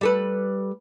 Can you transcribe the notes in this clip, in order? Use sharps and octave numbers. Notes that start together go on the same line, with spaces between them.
G3 A4 B4